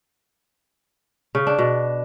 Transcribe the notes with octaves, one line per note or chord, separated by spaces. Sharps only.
C#3
D4
B2